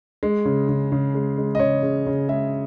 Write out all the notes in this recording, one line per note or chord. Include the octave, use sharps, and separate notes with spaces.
G#3
C#3
C#3
C#3
G#3
G#3
D#5
C#3 C#5
C#3
C#3
G#3 E5